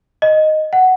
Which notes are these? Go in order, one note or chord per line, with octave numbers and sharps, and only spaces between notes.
D#5
F#5